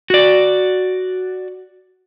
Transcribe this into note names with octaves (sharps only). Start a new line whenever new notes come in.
F#4 D5